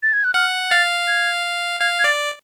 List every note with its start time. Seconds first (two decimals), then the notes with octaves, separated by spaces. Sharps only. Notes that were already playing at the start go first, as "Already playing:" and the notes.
0.03 A6
0.13 G#6
0.24 F#6
0.34 F#5 F6
0.71 F5 A6
1.08 G#6
1.80 F5 G#6
1.99 G#6
2.04 D5 A6